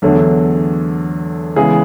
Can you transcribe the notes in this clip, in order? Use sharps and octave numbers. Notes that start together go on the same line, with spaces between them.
E2 D3 F#3 A3
C#3 E3 G#3 B3 G#4